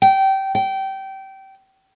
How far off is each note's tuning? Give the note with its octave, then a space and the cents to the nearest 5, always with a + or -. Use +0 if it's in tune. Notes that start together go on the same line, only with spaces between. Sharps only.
G5 -20
G5 -20